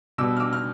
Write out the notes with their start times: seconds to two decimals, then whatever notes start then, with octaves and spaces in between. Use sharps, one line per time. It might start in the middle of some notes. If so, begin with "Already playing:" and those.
0.18 B2 G3 B3 D6 E6
0.37 F6
0.40 D6 E6
0.53 F6